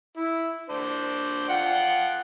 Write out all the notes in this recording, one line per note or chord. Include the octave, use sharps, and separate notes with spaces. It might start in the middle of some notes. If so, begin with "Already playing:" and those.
E4
D4 C5
F4 F#5 G5